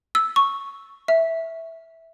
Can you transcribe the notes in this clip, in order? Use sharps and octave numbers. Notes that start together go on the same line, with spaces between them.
E6
C#6
E5